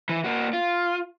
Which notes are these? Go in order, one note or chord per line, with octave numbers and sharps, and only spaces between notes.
E3
A#3 F#4
F4